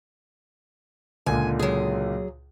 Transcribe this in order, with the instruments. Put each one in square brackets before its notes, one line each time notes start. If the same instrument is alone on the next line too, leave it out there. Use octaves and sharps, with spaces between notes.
[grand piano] C#2 A#2 D3 [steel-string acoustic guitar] G#5
[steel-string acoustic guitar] F#3 G#4